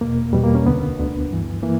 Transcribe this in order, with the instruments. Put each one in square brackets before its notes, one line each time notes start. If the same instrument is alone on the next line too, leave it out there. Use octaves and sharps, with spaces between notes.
[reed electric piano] E2 B2 A#3
E2 B2 G3
A#3
C#4
D2 D3 B3
D2 D3
G2 E3
E3 A#3